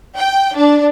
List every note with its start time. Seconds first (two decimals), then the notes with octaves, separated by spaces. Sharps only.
0.16 G5
0.55 D4